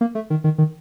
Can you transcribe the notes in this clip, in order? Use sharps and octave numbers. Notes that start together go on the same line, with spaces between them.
A#3
A3
D#3
D#3
D#3